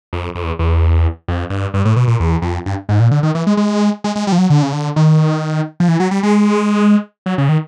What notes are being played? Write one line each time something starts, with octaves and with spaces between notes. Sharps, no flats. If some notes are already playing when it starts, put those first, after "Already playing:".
F2
F2
E2
E2
F2
G2
G2
A2
B2
A#2
E2
F2
G2
G#2
A#2
D3
D#3
E3
G#3
G#3
G#3
G#3
G3
F3
F#3
D3
C#3
D3
D#3
F3
E3
F#3
G3
G#3
F#3
C#3
D#3